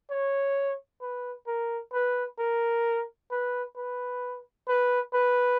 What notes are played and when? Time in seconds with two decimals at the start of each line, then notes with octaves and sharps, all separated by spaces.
0.10 C#5
1.01 B4
1.47 A#4
1.93 B4
2.39 A#4
3.31 B4
3.77 B4
4.68 B4
5.14 B4